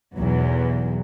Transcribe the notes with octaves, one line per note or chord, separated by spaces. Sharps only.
B1 E2 F#3